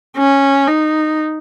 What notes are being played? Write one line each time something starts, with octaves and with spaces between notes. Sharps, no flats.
C#4
D#4